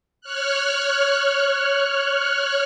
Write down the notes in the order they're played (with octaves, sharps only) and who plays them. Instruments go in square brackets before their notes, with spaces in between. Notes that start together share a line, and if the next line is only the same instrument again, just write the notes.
[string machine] C#5 F6 F#6